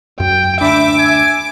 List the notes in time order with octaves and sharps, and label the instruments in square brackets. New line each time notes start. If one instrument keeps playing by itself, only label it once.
[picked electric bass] F#2 [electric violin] G5
[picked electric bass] D2 D4 [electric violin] E5 [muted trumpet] B5 [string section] D6
[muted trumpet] G#5